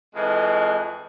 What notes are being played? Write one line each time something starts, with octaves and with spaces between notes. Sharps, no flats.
F2 E3 G#3